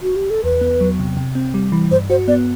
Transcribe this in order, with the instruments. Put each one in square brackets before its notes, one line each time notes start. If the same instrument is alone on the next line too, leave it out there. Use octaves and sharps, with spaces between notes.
[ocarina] F#4
G4
A4
[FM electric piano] E2 [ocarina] B4
[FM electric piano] B3
F#3
C3
C3
C4
G3
E3
[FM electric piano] G2 [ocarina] C5
[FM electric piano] F#4 [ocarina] C5
[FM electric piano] B3 [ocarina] D5